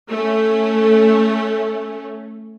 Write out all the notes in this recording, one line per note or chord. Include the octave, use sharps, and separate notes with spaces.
A3 C#4